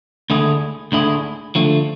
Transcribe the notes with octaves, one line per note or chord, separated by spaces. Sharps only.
D2 D3 A3 E4 G#4
D2 D3 A3 E4 G#4
D3 F3 A3